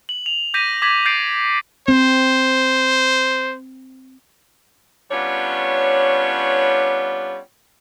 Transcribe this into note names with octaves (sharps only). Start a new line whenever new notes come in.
F#7
F7
D6 G6 A#6 B6 D#7
D6 G#6 B6 F#7
G6 A6 C7 D7
C4 C5
G3 B3 C#4 D4 F4 C#5